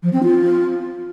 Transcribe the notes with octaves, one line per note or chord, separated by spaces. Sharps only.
F3
C4
F4